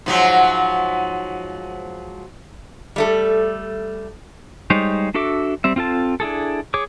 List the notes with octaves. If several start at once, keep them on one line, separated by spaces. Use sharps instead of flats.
G#2 F3 F#3
G3 A3 A4
G3 G#3 D#4 C5 C#5
D4 F#4 A4 E5 D6
G3 C4 E5
C4 F4 A4 A5
D4 E4 G#4 A4
G#4 C#5 D6